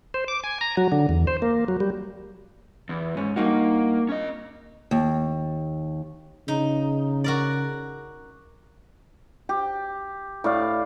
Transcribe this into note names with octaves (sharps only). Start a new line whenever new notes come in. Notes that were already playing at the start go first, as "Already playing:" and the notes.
C5
D6
G#5
A#5
F#3
D3
E2
C5
A#3
F#3
G3
E2
G#2 C#4
G2 A#3 D#4 F#4
C#4 D#5
D#2
C#3 D#4
F#4 A#4 D5
G4
A2 D5 F5